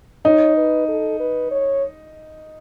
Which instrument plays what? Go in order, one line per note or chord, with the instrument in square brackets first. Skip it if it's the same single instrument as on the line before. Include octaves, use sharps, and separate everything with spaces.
[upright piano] D#4 [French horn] C#5
[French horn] B4
A4
B4
C#5